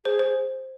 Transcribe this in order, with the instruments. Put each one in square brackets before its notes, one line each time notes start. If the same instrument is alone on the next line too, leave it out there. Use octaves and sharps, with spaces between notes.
[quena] G#4 [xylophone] C5
[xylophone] C5